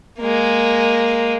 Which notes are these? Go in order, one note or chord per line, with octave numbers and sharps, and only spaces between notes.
G#3 A#3